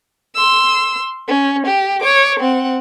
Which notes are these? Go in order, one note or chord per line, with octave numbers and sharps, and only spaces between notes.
C6 E6
C#4
G4
C#5 D6
C4 F#5